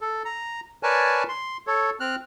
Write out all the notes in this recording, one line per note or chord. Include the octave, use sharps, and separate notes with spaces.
A4
A#5
A#4 B4 C#5 D5 G#5 A5
C6
A4 C#5
C4 F6 F#6